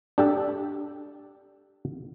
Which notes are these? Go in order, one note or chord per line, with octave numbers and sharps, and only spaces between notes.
D4 G4 A4